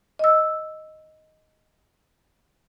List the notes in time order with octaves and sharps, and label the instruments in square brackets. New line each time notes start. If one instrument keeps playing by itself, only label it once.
[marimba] D#5 E6